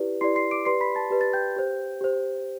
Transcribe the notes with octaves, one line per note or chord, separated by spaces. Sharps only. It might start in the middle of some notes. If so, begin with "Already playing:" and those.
Already playing: E4 G4 B4 D5
E4 G4 B4 D5 C6 C7
C6 C7
D6 D7
G4 B4 D5 C6 C7
B5 B6
A5 A6
G4 B4 D5
A6
G5 G6
G4 C5
G4 C5